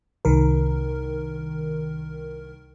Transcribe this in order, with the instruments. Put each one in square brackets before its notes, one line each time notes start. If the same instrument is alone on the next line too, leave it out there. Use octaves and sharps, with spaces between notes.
[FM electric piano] C2 D#3 A#4